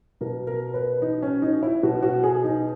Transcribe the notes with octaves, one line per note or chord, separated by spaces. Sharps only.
B2 A#4
A#4
B4
D#4
C#4
D#4
E4
B2 F#4
F#4
G#4
D#4